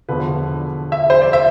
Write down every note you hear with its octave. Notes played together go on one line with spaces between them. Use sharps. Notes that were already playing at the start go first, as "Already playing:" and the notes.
E1 E2 D3 F3 B4
E5
C5
D5
E5